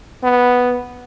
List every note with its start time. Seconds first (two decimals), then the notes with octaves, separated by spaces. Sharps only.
0.23 B3